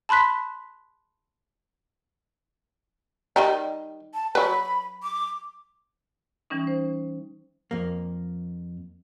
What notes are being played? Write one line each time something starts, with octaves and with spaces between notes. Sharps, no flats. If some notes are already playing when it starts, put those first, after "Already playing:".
A5 B5 C6 F#6 B6
D#3 G3 D#4
A5
F#3 B4 B5
D6
E3 G3 C#4 D#4
C5
F2 A#3